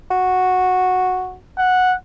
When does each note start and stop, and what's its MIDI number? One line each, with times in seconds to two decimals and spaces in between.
0.11 1.35 66
1.58 1.95 78